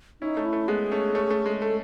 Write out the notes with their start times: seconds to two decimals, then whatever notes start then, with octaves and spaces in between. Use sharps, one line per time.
0.21 C#4 D#4 E4
0.37 A3 C#4
0.45 E4
0.53 A3
0.68 G#3 B3 G#4
0.92 A3 C#4
1.15 A3 C#4
1.31 A3
1.46 G#3
1.62 A3 A4